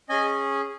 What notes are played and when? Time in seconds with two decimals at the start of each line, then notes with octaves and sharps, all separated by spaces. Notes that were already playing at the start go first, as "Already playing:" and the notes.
0.09 C#4 G#4 D#5 G#5